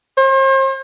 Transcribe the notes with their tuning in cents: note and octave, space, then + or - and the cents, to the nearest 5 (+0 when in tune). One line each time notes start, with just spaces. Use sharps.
C5 +40